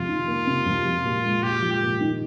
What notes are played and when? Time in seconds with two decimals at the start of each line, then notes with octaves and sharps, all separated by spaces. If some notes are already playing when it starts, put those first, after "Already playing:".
Already playing: F2 C3 F4
0.08 D#3
0.27 A#3
0.47 C3
0.66 F2
0.85 F3
1.05 A#2
1.24 G#3
1.43 A#2 G4
1.62 F3
1.73 G4
1.82 A#2
2.01 D#3